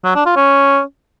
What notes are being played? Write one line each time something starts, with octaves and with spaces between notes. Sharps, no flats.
F#3
D4
F4
C#4